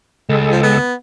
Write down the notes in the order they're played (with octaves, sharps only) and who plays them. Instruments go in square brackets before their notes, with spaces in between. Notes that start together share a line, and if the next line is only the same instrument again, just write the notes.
[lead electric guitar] C#2 [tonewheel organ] G#3 A4
[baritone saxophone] F3
B3